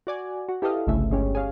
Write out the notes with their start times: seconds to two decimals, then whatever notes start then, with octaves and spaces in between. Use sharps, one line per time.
0.07 F#4 D5 G#5
0.49 F#4
0.62 E4 G4 A4 B4 D#5 F5
0.87 G1 C2 C#3 A3 E5
1.10 G1 G#3 C#4 G4
1.35 G#4 C#5 F5